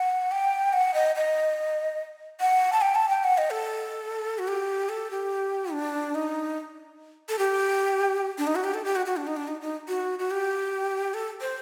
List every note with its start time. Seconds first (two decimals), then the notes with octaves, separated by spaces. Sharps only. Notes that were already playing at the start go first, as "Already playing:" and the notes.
Already playing: F#5
0.32 G5
0.73 F#5
0.94 D#5
1.16 D#5
2.41 F#5
2.72 A5
2.81 G5
2.95 A5
3.09 G5
3.24 F#5
3.38 D#5
3.50 A4
4.38 F#4
4.48 G4
4.89 A4
5.11 G4
5.72 D4
6.15 D#4
7.29 A4
7.39 G4
8.38 D4
8.47 D#4
8.55 F#4
8.64 G4
8.74 A4
8.85 G4
8.96 F#4
9.06 F#4
9.17 D4
9.27 D#4
9.37 D4
9.47 D#4
9.61 D#4
9.88 F#4
10.19 F#4
10.31 G4
11.14 A4
11.41 C5